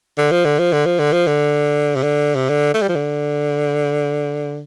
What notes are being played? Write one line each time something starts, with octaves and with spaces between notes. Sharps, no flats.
D3
F3
D3
F3
D3
F3
D3
F3
D3
C3
D3
C3
D3
A3
G3
F3
D3